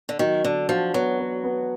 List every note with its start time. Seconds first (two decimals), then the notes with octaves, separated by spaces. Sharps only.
0.09 D3
0.19 D#3 F#3
0.44 D3 D4
0.69 F3 F#4
0.94 F#3 B3
1.19 B3
1.44 B3